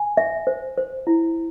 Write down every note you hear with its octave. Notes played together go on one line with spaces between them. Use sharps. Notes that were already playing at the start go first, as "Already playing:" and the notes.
Already playing: G#5
E5
C5
C5
E4